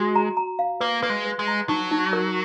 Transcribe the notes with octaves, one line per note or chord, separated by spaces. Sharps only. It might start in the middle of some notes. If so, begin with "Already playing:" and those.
Already playing: G#3 F#4
A#5
A#5
F5
A#3 B4
A#3 B4
G#3
B4
G#3
A#5
F#3 D#4
D#4
A#4